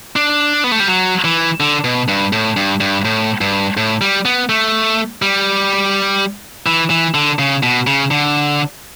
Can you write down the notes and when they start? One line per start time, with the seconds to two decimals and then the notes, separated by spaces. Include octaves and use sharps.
0.16 D4
0.64 B3
0.72 A3
0.80 G3
0.88 F#3
1.24 E3
1.60 D3
1.84 B2
2.08 G2
2.33 A2
2.57 G2
2.80 G2
3.05 A2
3.41 G2
3.77 A2
4.01 G3
4.25 B3
4.49 A3
5.22 G3
6.66 E3
6.90 E3
7.14 D3
7.39 C#3
7.63 B2
7.87 C#3
8.11 D3